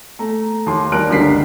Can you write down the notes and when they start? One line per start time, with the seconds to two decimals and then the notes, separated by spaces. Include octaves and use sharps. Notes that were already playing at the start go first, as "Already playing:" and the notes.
0.19 A3 A#5
0.66 D#2 C6
0.92 D#2 G3 A#4 F6 F#6 D7
1.09 G1 C#2 D3 D#3 B6 C7